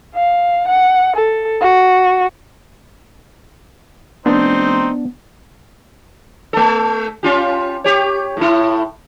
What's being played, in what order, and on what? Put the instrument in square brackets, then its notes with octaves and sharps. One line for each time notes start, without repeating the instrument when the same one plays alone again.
[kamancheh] F5
F#5
A4
F#4
[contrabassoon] F1 [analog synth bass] B3 [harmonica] C4 D#4 C5 [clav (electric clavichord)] D4
[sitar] A3 A4
C#4 F4 G4
G4 C#5
A2 E4